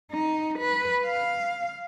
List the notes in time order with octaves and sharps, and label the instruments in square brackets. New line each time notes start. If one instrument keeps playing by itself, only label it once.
[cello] D#4
B4
F5